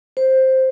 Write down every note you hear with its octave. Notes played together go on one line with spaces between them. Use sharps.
C5